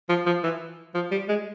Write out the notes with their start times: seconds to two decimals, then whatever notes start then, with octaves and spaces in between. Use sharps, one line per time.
0.09 F3
0.26 F3
0.44 E3
0.94 F3
1.11 G3
1.28 G#3